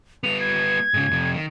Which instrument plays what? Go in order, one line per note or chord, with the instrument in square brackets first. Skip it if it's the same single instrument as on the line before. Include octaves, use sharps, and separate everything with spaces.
[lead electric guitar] G3 B3 [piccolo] F7
[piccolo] G#6
[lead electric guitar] G#2 C#3
F2 C3
D#3